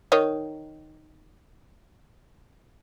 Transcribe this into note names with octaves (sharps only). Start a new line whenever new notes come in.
D#3 D#4 C#5